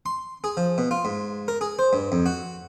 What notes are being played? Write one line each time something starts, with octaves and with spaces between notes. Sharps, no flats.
C6
G#4
F3
B2
F4
G#2
A#4
G#4
C5
G2
F2
F#4